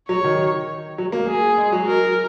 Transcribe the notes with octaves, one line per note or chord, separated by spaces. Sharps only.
F#3 C#5
D#3
F#3
A#3
G#4
G#3
F#3
A#4